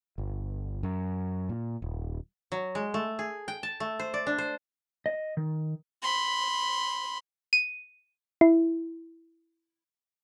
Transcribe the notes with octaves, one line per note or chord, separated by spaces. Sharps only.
G1
F#2
A#2
D#1
F#3
G#3
A3
G#4
G5
A5
A3
C5
D5
D4
C5
D#5
D#3
B5 C6
D#7
E4